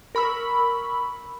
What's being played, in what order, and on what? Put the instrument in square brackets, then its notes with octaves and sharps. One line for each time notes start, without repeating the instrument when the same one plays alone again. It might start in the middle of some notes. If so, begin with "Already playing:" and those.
[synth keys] A#4 B5 C#6 E6